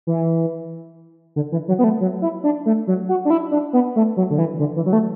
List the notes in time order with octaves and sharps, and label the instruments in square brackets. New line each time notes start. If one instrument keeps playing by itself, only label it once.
[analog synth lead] E3
D3
E3
F#3
B3
A3
F#3
E4
D4
A3
F#3
F#4
D4
E4
D4
B3
A3
F#3
D3
E3
D3
E3
F#3
A3